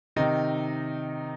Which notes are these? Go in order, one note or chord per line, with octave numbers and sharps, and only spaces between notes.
C3 D#3 D#4